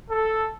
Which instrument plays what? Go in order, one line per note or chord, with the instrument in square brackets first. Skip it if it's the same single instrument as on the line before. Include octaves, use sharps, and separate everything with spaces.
[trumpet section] A4